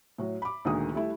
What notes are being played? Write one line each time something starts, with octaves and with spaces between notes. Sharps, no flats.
A2 F#3
B5 D6
D2 A#2 D3 D#3 G#3 D#6
G3 A3 E4